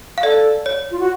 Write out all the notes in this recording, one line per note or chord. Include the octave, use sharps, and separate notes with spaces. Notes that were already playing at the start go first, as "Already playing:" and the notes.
F5
A4 D5
C#5
F4
F#4